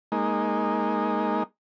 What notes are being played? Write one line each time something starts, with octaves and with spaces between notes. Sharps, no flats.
G#3 A#3 D#4